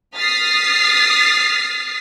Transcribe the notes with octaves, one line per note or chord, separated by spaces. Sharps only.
D#6 F6 A6 B6 C7